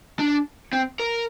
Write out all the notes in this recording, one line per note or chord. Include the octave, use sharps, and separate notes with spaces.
D4
C4
A#4